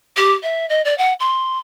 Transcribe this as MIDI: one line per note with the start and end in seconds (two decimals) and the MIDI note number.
0.16 0.33 67
0.43 0.68 76
0.69 0.82 75
0.85 0.96 74
0.98 1.13 78
1.19 1.58 84